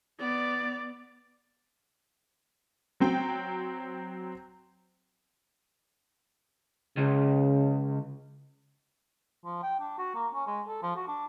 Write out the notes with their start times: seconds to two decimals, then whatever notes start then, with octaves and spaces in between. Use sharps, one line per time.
0.19 B3 D5
3.00 F#3 C4 G5
6.97 C#2 C#3
9.45 F3
9.63 G5
9.80 D4
9.98 F#4
10.15 A#3
10.34 C#4
10.47 G#3
10.68 A4
10.83 F3
10.96 F#4
11.08 D4